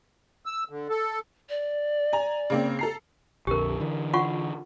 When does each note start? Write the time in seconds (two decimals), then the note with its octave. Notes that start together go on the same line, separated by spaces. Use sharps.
0.46 E6
0.70 D3
0.89 A4
1.49 D5
2.13 G#5 A#5
2.50 C#3 A#3 C4
2.79 A4 A#5 C7
3.47 A#1 F2 D3 G4 A#4
3.80 D3 E3
4.13 F4 F#5 C#6